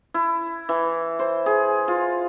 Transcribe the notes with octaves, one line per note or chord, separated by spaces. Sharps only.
E4
E3
C5
G#4
F4